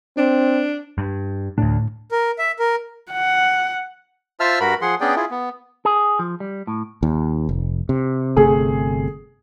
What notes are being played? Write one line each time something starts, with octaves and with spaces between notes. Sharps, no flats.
C4 D4
G2
D2 A2 D4
A#4
E5
A#4
F#5
F4 C5 E5 A5 E6 F6
G2 F#4 A#4 B5
F3 G#4 F#5 C6
B3 C#4 D4 G#4 D5 G5
E4 F4 G#4
B3
G#4
F3
G3
A2
D#2
F1
C3
G1 C3 A3 G#4